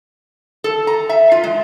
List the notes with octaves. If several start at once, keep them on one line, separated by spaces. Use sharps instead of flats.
A4
A#5
E5
F4
G#3